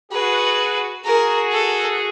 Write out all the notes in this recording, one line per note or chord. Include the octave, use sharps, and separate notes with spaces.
F#4 G#4 B4
F#4 G#4 A#4
A4